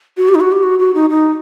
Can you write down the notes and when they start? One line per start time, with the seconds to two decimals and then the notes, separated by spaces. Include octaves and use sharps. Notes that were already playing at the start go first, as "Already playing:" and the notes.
0.17 F#4
0.28 G4
0.35 D#4
0.40 F#4
0.52 G4
0.63 F#4
0.79 F#4
0.95 D#4
1.10 D#4